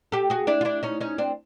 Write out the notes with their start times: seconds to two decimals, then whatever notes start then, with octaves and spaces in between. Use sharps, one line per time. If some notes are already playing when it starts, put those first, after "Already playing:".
0.12 G4 A4
0.30 F#4 G#4
0.47 D4 E4
0.61 F4
0.65 D4 E4
0.83 C#4 D#4
1.00 C#4 D#4
1.18 C4 D4